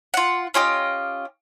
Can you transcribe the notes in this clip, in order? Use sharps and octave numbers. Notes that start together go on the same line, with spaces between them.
F4 F#5
C#4 F4 G4 D#5